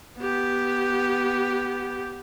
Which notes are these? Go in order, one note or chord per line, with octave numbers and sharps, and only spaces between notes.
B3 G4